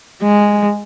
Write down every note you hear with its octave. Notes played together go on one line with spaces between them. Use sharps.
G#3